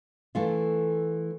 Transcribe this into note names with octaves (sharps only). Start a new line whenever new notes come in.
E3 A3 F4